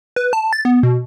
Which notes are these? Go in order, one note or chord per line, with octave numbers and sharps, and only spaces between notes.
B4
A5
A6
B3
B2